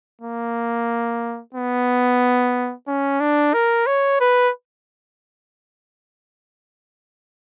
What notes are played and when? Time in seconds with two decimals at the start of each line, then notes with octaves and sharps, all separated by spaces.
0.22 A#3
1.54 B3
2.88 C#4
3.21 D4
3.54 A#4
3.87 C#5
4.21 B4